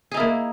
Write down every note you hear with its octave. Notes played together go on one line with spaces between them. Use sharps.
A#3 D#4 E4 G#4